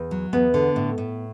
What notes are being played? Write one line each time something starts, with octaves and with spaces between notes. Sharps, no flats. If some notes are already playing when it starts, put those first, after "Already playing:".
Already playing: E2
F#3
E2 B3
D3
A2
A2